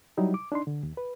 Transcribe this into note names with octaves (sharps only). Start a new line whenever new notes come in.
F#3 G3 D#4 E4
D6
D4 D#4 C6
D3
D#2
B4